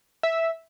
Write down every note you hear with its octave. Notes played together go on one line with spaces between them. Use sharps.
E5